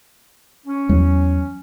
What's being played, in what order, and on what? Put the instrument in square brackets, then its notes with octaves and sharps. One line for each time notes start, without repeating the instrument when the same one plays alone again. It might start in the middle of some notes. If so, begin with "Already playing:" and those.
[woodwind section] C#4
[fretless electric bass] E2 F#3